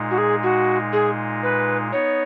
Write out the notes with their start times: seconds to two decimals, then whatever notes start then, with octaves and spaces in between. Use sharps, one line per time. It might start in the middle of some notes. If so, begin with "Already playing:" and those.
Already playing: A#2 G#3 D#4
0.11 F#4
0.18 G#4
0.43 F#4
0.93 G#4
1.43 B4
1.92 B3 D#4 C#5